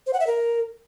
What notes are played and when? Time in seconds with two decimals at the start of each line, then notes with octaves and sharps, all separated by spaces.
0.06 C5
0.13 F#5
0.20 E5
0.27 A#4